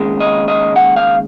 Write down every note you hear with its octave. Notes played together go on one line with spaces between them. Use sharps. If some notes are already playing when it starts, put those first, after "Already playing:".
Already playing: D#2 C#3 G#3
D#5
D#5
F#5
F5